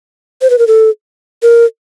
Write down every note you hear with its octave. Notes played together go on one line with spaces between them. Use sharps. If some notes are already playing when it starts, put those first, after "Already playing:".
C5
B4
A#4
A4
A#4